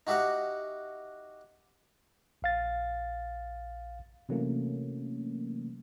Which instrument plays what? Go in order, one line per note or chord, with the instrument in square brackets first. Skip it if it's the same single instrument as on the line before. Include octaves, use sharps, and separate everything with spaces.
[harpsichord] D#4 F#4 G4 E5 F#5
[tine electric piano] A#1 F5 A6
[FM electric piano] C3 E3 F#3 A3 A#3 C#4